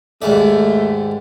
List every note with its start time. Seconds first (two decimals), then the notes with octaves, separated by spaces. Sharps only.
0.22 D#2 G#2 A3 D5